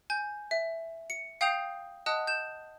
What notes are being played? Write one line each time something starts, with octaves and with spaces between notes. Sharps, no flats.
G#5 G6
E5
C#7
F5 G5 D#6 G6 C7 F7
D#5 F#5 A5 D#6 F#6
G6 E7